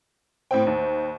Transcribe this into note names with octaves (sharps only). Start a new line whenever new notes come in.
A2 C4 C5 G5
D#2